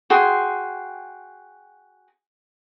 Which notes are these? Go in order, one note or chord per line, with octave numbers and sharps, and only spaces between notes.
F#4 G#4 G5 C6